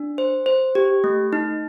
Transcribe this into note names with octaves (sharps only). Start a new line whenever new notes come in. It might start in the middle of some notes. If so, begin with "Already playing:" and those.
Already playing: D4
C5
C5
G4
A3
D#4